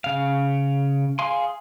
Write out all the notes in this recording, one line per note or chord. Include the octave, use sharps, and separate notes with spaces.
C#3 F5
G#4 F5 G#5 C6